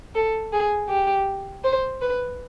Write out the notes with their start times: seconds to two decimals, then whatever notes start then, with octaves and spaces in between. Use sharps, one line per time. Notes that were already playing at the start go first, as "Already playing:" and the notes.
0.15 A4
0.53 G#4
0.89 G4
1.65 C5
2.02 B4